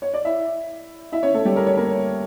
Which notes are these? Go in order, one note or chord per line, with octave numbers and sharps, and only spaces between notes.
C#5
D5
E4 E5
E4 E5
C#4 C#5
A3 A4
G3 G4
A#4
C#5
A#3 A#4